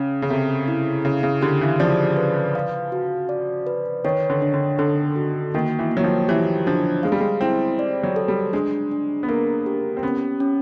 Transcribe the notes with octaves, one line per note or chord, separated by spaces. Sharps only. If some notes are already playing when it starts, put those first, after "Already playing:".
Already playing: C#3 C#4
C#3
C3 A4
E4
C#3 F5
C#3
D3 G4
E3
F3 D5
B4
F5
F#4
D5
B4
D#3 C#5
D3
D4
D3
D3 A4
F#4
D#3 A#3
E3
A#3
F#3
F3
E3 G4
F3 D4
G#3 F5
G3
G#3
C4 E4
D5
F#3
A4
G3
G#3 D4
D4
B3
A#3 A#4
G4
C4
B3 C#4
C#4